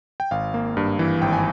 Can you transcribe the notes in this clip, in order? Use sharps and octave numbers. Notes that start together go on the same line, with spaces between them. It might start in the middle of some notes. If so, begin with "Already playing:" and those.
G5
G#1 F5
A#3
G2
E3
G#1 G5
G#5